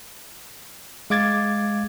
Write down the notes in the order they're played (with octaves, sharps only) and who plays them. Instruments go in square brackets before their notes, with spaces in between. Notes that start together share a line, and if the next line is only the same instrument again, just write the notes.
[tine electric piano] G#3 F5 D6 G#6 A6